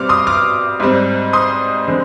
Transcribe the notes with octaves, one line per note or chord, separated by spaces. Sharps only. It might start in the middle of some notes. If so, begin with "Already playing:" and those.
Already playing: B2 G3 C4 D6 F6
C6 D#6
D6 F6
G#2 G3 C4
C6 D#6
D3 G#3 C4